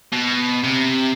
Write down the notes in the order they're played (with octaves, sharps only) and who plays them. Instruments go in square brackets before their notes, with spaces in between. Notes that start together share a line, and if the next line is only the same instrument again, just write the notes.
[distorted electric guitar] B2
C3